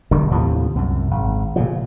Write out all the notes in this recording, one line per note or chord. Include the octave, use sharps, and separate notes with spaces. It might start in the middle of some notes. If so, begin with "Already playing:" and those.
E1 D3 D#3 G3
D#2 A2 C3 F3
C2 F#2
G#1
A#2 C#3 F3